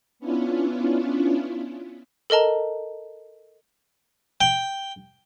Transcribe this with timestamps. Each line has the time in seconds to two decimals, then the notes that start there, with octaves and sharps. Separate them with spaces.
0.19 B3 C#4 D4 E4 F4
2.30 A4 A#4 D#5 A5 A#5
4.41 G5